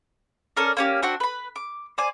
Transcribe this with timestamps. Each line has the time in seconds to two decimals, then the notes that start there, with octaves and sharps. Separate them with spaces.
0.57 C#4 A4 A#4 D5
0.77 A#3 C#4 G4
1.03 C4 D4 F#4 F#5
1.20 B4 B5
1.56 D6
1.98 C5 D5 G#5